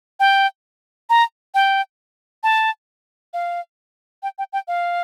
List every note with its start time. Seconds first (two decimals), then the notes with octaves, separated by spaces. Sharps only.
0.20 G5
1.10 A#5
1.54 G5
2.43 A5
3.34 F5
4.23 G5
4.38 G5
4.53 G5
4.68 F5